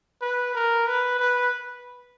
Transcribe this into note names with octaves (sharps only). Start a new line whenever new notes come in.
B4
A#4
B4
B4